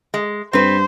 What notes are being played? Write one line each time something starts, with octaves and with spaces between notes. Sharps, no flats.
G#3
G2 C4 B4 C5